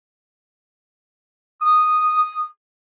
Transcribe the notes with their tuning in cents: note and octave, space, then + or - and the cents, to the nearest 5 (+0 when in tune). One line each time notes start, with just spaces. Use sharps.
D#6 -5